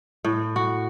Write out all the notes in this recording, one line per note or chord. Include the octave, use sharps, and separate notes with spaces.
A2
F#4